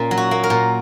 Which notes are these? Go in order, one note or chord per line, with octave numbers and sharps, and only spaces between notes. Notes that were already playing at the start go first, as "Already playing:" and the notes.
Already playing: A#2 A#3 C#4
F#3
F#4
A#3
A#4
A#2